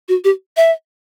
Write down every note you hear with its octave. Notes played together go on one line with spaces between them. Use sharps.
F#4
G4
E5